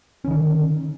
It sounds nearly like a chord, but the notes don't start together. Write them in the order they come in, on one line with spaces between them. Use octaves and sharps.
C#4 D3 D#3